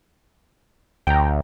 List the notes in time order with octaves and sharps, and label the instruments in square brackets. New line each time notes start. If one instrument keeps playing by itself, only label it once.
[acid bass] D2 [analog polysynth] G5 A#5